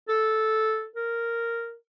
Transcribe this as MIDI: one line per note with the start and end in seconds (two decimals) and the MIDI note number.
0.08 0.85 69
0.96 1.75 70